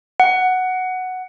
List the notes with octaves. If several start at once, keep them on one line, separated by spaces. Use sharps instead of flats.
F#5